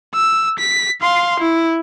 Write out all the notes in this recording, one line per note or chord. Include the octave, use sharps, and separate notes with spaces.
E6
B6
F5 C6
E4